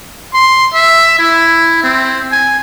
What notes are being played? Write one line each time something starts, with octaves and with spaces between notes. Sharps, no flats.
C6
E5
E4
C4
G#5